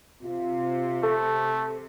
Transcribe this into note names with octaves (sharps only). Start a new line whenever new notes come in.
C3 F4
A3 A4